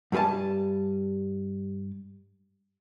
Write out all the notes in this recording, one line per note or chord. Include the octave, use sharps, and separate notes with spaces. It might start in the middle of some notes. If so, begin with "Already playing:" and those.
G2 G3 G#4 G#5 A5